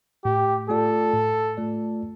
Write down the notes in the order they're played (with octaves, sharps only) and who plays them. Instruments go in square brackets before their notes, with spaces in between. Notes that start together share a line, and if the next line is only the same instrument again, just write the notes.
[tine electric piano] A2 [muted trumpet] G4
[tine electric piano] A3 F4 D5 [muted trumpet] A4
[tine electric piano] A2
A3 F4 D5